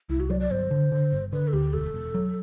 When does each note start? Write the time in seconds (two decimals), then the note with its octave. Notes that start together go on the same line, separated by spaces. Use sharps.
0.09 C2 E4
0.20 F#4
0.30 F#3 D5
0.40 D5
0.51 G1 C5
0.71 D3
0.92 D3
1.12 G1
1.32 D3 B4
1.48 A4
1.53 D2 G4
1.74 E1 A4
1.94 E1
2.14 F#3